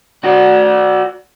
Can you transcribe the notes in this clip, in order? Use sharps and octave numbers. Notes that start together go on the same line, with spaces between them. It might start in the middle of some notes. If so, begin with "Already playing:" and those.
F#4 D5